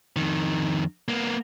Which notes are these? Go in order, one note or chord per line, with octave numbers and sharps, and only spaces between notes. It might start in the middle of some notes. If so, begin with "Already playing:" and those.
F2 D#3
A#3 B3